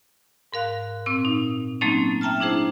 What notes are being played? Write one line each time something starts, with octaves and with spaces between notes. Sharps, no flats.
G#2 A#4 F5 F#6
A#2 C4 E6
D#4
F#3 A3 A#3 C4 C#4 D#4
E5 G5 A5 A#5 F6
D4 E4 G#4 C5